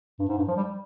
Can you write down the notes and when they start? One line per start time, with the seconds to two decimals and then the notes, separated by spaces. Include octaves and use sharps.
0.19 G2
0.28 G#2
0.37 G2
0.48 F3
0.56 G3